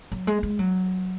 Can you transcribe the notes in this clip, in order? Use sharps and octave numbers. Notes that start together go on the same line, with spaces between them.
F#3
G#3
G#3
F#3